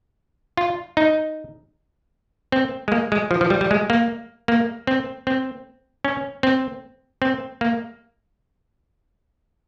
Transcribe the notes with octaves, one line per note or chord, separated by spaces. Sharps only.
F4
D#4
C4
G#3
A#3
G#3
F3
F3
G3
G3
G#3
A#3
A#3
C4
C4
C#4
C4
C4
A#3